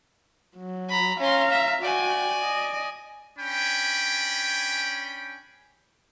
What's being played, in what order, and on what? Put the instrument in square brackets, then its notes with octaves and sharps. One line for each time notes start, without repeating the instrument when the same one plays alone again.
[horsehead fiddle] F#3
[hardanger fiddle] A#5 B5
[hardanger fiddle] C#4 C6 [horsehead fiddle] F5 A#5
[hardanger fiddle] E5
[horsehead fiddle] F#4 G5 [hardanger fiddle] D5 G#5
[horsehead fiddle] D#5
[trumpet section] C#4 D4 G5 G#5 B5